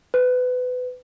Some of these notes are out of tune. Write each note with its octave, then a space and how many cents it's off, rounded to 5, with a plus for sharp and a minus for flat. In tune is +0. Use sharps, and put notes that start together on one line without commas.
B4 +25